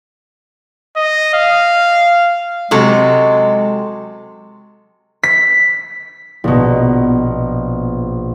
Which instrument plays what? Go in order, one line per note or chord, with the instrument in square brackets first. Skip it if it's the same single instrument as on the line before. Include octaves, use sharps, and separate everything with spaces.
[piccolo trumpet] D#5
F5
[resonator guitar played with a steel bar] C3 F#3 A4 [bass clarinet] G#3
[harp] B6
A#1 B2